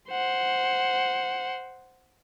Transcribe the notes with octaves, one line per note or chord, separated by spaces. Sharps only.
C5 F#5